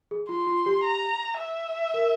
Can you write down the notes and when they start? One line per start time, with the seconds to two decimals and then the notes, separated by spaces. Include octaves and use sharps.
0.11 G#4
0.29 F4 C6
0.47 F4
0.66 G4
0.84 A#5
1.38 E5
1.94 A#4